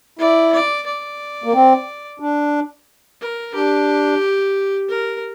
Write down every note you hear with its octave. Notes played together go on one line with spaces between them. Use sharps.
E4 D5
D5
D5
A#3
C4
D4
A#4
D4 G4
A#4